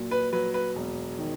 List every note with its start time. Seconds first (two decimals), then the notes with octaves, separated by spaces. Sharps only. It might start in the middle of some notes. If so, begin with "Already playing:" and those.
Already playing: A#2 F#3
0.11 B4
0.33 F#3 B4
0.54 B4
0.75 E1
1.19 D#3